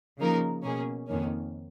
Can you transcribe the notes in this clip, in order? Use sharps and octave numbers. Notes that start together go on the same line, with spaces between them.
C#3 F3 A#3 D#4 A#4
B2 A#3 C#4 G#4
F2 D#3 A#3 C#4